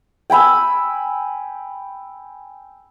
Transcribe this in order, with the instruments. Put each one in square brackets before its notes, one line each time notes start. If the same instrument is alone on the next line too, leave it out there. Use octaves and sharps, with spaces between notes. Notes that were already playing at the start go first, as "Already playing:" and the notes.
[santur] G5 G#5 B5 E6